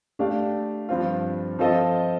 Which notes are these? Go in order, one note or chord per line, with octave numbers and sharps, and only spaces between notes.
A3 D4 G4 D5 F5
G2 F3 C4 F4
F3 C4 F4 A4 D#5